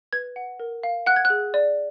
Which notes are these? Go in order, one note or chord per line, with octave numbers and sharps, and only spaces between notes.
B4 G#6
F#5
A#4
F5
F#5 F#6
G#6
F#6
G#4
D5